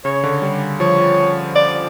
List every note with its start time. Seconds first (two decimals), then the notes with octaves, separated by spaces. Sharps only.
0.05 C#3 C#5
0.23 D3
0.42 G3
0.80 F3 C#5
1.55 D5